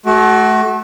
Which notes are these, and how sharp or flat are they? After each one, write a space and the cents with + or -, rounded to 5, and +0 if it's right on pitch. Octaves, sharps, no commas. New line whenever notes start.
A3 -30 F#4 +20